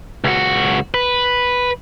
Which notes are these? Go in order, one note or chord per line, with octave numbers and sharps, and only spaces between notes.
C#2 F#4
B4